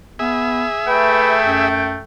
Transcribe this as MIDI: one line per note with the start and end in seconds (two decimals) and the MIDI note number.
0.19 0.66 59
0.19 1.68 68
0.19 1.68 76
0.87 2.03 57
0.87 1.34 71
0.87 2.02 79
1.41 1.99 42